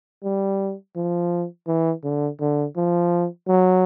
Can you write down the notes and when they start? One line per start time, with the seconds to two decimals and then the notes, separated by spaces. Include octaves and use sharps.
0.24 G3
0.96 F3
1.67 E3
2.04 D3
2.40 D3
2.76 F3
3.48 F#3